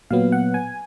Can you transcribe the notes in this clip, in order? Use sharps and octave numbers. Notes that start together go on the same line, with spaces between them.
A#2 F#3 B3 F5
F#5
G#5